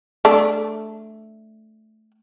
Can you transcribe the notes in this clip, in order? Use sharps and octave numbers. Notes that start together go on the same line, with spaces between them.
A3 D4